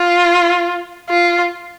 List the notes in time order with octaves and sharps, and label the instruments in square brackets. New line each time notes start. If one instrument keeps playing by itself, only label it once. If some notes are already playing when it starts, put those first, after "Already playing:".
Already playing: [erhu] F4
F4